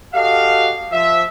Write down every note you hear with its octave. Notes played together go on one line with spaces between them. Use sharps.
F#4 G4 A4 D#5 F5
F3 E5